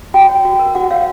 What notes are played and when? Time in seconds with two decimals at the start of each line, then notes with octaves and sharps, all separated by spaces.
0.14 F#4 G5
0.29 C#5
0.45 F#4
0.59 A#4
0.75 F#4 F#5
0.91 C#5 F5